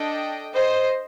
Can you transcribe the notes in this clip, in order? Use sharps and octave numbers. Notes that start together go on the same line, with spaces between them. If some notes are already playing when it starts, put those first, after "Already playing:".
Already playing: D4 A4 D#5 G5
C5 D#5